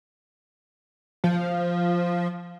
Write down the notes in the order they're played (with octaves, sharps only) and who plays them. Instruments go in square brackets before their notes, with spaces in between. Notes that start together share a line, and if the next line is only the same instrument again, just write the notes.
[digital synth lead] F3